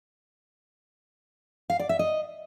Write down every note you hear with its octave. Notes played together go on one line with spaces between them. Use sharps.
F5
D5
E5
D#5